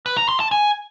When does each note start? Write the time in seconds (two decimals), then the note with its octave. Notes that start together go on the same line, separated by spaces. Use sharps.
0.06 B4
0.17 A#5
0.29 C6
0.40 A5
0.51 G#5